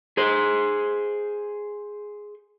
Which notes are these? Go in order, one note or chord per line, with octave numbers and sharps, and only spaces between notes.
G#4 C5